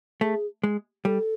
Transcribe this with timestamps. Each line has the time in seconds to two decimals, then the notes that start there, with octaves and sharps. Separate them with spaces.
0.21 A3 G#4
0.63 G#3
1.05 G3 A4